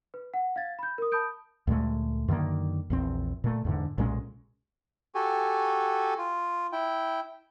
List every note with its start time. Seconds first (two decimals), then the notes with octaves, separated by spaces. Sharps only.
0.14 B4
0.34 F#5
0.56 F5 G#6 A6
0.79 B5 G6
0.98 A#4 D#6
1.12 A5 B5 D#6 G6 D7
1.67 D2 A#2 G#3 A3
2.28 F#2 D3 D#3 A#3
2.90 A#1 E2 C4
3.44 A#2 A3
3.65 E2 G#2 D3
3.98 B1 A#2 G#3 C#4
5.15 F#4 G4 A4 G#5
6.18 F4
6.72 E4 G5